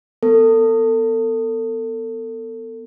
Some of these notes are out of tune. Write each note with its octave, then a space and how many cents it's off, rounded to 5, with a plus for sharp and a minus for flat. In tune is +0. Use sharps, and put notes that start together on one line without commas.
B3 +0 A4 +35